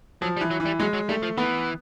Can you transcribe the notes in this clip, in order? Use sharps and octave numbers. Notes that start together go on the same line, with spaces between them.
F3 F#3
G3
E3
F#3
E3
G3
F#3 G#3
F#3
G3 A3
F3
E3 B3